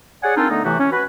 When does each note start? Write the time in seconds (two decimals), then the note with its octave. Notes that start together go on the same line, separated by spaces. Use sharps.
0.24 G#4 C#5 D5 F#5 G#5
0.37 A#3 C4 D4 D#4 F4 A4
0.50 D3 A3 B3 D#4
0.65 A2 C3 E3 A3 F#4 G4
0.79 C#4
0.92 F#4 B4